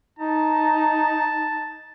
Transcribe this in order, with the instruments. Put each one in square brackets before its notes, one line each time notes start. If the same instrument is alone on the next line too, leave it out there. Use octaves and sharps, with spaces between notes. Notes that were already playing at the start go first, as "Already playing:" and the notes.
[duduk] D#4 [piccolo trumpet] A5